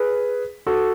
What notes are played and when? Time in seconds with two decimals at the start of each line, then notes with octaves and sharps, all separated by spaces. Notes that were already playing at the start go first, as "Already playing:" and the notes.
Already playing: G#4 B4
0.67 F#4 A4